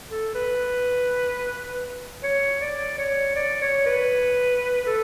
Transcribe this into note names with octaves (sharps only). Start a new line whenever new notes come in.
A4
B4
C#5
D5
C#5
D5
C#5
B4
A4